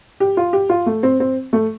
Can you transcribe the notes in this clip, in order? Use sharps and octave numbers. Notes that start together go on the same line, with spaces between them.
G4
F4
G4
F4
A3
C4
C4
A3